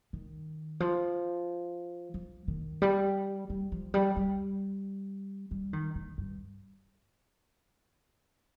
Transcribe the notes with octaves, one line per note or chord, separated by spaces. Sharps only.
D#3
F3
F3
D#3
G3
G3
F3
G3
G3
G3
D#3
D3
G2